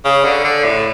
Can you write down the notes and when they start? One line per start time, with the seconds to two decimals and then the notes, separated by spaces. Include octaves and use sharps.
0.05 C#3
0.24 D3
0.44 D3
0.64 A2